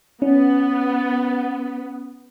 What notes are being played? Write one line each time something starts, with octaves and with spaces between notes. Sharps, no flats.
B3 C#4